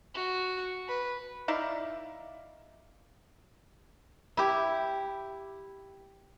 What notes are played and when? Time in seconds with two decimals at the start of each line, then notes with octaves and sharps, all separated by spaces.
0.15 F#4
0.88 B4
1.48 D#4 E4 D5 F5
4.37 E4 G4